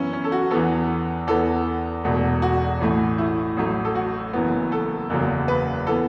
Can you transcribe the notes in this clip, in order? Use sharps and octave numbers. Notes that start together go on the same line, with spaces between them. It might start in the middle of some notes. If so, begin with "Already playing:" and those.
Already playing: F#2 E3 B3 C#4 E4
C#4
A4
F#4
E2 E3 B3 A4
E2 E3 B3 A4
E1 E2 B2 A3
F#4
A1 A2 E3 A3
E4
A1 A2 F#3 A3
A4
F#4
F#1 F#2 E3 B3
A4
F#1 E2 C#3 F#3
B4
E3 B3 A4